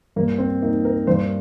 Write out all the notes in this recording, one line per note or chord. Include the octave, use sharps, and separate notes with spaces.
G2 A#3
C4
A#3 D#4
A#4
G2 C5